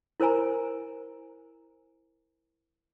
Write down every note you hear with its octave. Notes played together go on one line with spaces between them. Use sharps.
E4 A#4 C5 G#5 A#5